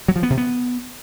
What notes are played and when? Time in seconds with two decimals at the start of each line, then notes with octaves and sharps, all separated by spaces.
0.08 F#3
0.16 F3
0.23 B3
0.30 C3
0.38 B3